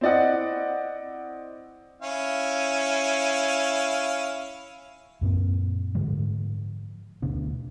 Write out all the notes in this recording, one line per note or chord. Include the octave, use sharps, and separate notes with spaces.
C4 E4 D5 D#5 F#5
C#4 E4 F5
F#2 A#2 C4
G#2 D3 F3 G#3
D2 B2 B3 D4